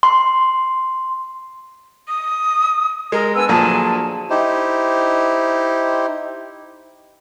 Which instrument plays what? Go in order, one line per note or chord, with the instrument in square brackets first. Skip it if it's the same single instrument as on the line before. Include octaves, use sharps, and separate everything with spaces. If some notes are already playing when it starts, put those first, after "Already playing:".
[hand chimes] C6
[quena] D#6
[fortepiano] G#3 [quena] A#4
[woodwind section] B3 D4 E6 [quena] G#5
[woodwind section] D2 G#4 A5 [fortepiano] A#2 F3 F#3
[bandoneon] D#4 E4 G4 C5